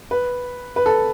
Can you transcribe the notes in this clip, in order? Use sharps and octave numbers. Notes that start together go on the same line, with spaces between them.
B4
B4
A4